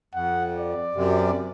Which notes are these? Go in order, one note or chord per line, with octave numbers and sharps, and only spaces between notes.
F2 F#5
D5
F#2 C3